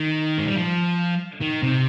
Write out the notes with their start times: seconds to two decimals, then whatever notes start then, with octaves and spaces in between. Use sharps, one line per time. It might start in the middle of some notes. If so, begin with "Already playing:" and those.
Already playing: D#3
0.38 G#3
0.47 G3
0.56 F3
1.41 D#3
1.63 C3